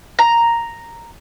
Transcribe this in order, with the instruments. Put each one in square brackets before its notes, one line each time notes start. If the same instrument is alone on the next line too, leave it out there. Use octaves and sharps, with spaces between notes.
[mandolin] A#5